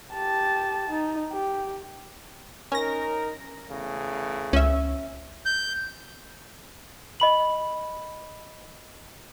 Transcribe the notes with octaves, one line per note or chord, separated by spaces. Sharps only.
G4 A5
D#4
G4
C#4 D#4 A#4 A#6
E2 C#3 A3
C#2 C#4 E5
G6
D#5 B5 F#7